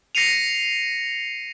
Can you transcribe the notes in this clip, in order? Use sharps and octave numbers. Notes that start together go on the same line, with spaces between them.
A#6 C7 C#7 D#7 F7